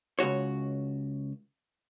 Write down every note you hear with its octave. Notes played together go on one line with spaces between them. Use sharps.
C#2 F#2 F#4 C#5